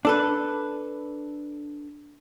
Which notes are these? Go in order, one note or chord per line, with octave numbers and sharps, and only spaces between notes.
D4 A4 B4